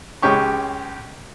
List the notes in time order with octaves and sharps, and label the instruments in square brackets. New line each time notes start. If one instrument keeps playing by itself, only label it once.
[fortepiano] C#2 G#3 C#4 G4 C#6